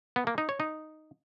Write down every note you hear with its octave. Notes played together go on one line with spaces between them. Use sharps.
B3
A#3
D#4
C#5
D#4